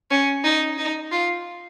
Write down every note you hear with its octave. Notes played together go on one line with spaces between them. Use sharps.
C#4
D#4
D#4
F4